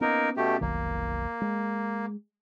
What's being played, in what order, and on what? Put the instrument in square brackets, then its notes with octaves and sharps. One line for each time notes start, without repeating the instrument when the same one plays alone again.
[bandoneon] A#3 D#4 A#4 [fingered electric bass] B3 C#4
[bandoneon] B2 A3 G4
[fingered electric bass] F1 B1 D#3 [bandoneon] A#3
[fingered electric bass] G#3